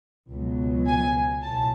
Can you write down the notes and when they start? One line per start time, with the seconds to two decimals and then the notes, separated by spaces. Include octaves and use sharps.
0.32 C#2 B2 F#3
0.87 G#5
1.42 B1 A2 A5